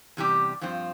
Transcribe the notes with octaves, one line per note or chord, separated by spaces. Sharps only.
E2 C3 G3 D4 G4
G2 F3 C4 F4